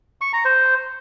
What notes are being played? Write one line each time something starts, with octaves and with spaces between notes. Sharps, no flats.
C#6
A#5
C5